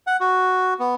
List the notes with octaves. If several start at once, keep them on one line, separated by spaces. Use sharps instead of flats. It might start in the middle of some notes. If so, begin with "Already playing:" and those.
F#5
F#4
B3